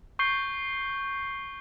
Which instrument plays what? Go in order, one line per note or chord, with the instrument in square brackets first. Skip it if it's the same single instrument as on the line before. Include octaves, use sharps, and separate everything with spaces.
[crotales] C#6 G6 C7 G7